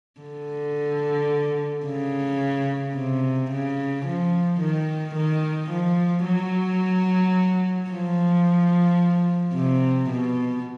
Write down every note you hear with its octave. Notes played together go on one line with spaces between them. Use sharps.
D3
C#3
C3
C#3
F3
D#3
D#3
F3
F#3
F3
C3
B2